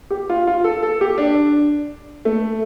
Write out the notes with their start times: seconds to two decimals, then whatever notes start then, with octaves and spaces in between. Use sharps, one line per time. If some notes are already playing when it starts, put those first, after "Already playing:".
0.10 G4
0.30 F4
0.47 F4
0.64 A4
0.83 A4
1.01 G4
1.18 D4
2.25 A3